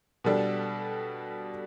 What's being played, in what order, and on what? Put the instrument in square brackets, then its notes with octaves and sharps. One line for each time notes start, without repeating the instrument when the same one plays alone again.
[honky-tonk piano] B2 G3 D4 A4